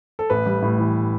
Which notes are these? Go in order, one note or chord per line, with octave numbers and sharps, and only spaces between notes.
A4
A1 B4
G3
A2
E3